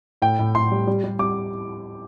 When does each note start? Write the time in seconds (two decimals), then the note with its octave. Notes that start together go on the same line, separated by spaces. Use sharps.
0.22 A2 G5
0.39 A2
0.55 A2 C6
0.71 G3
0.87 G3
1.04 G3
1.19 G3 D6